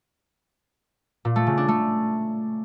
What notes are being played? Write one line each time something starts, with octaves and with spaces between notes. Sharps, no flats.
A#2
A3
C#3
D4
A3